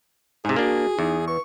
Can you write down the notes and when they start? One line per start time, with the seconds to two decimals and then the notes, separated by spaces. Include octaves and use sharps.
0.45 G#2 C3 G#4
0.56 A#3 D4 F#4
0.99 E2 D#4
1.28 B4 C#6